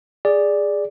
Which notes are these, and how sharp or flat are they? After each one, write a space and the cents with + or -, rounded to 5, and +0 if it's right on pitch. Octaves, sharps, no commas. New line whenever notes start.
G#4 -10 D5 +0